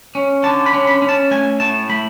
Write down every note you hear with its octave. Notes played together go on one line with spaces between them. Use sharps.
C#4
D3 A5
B5
C#4
B5
C#4
A5
A3 G#5
A2 A5
A3 B5